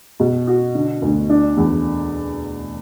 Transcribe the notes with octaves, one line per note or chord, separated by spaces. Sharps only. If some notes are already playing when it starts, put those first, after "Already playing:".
B2
F#4
D3
D2
D4
E2